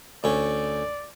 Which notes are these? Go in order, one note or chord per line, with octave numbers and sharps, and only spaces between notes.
D2 C#4 D5